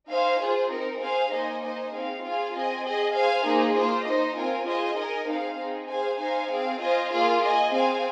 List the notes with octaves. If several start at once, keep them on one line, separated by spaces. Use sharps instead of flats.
D#4 C5 F5 G#5
F4 G#4 C5
C4 D#4 A#4
G#4 C5 F5 G#5
A#3 D#4 C5 D#5 G#5
D#4 C5 D#5 G#5
C4 D#4 G#4 F5
F4 G#4 F5 G#5
C4 G#4 D#5 G#5
G#4 D#5 G#5
G#4 C5 F5 G#5
A#3 D#4 G#4 C5
A#3 F4 C5
D#4 C5 D#5
C4 F4 A#4 G#5
F4 G#4 C5 D#5 G#5
D#4 A#4 D#5 G#5
C4 D#4 G#4 C5 F5
C4 D#4 G#4
G#4 C5 F5 G#5
D#4 C5 F5 G#5
C4 G#4 F5
F4 C5 D#5 G#5
A#3 F4 G#4 F5
G#4 D#5 G#5
C4 G#4 F5 G#5